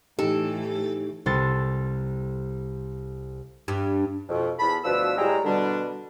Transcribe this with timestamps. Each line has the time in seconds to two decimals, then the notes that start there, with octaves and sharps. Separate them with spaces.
0.19 A2 E3 D#4 G4 A4
1.26 C2 C3 A4 C6 A6
3.68 G2
4.29 F2 B2
4.59 E2 A5 B5
4.85 D2 B2 F3 D4 B4 E6
5.18 A2 G3 G#3 G5 A#5
5.45 B2 D3 G3 D4